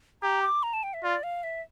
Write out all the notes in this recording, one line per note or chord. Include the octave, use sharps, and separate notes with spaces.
G4 A#5
D6
A#5
A5
G5
E5
F4 D5
F5
E5